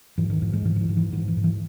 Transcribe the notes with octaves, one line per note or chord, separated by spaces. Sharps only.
G#2 E3
D#3
G#2 E3
G#3
G#2 E3
D#3
E3
G#2
E3
G#2 E3
E3
G#2
E3